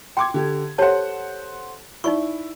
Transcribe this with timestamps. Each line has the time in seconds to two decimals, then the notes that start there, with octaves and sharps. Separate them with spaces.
0.17 G5 C6 D6 G#6
0.34 D3 G4
0.78 G4 A4 C5 C#5 F#5 A5
2.04 D#4 E4 D5 C#6